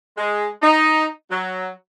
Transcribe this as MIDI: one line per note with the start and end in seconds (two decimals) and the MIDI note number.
0.17 0.48 56
0.62 1.06 63
1.31 1.68 54